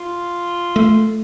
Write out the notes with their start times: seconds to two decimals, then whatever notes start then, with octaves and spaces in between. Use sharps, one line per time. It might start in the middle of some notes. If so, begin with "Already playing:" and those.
Already playing: F4
0.76 A3